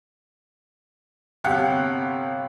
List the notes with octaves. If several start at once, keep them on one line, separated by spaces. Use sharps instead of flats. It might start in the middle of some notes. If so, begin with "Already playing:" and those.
G1 C3 G4 F5 F#5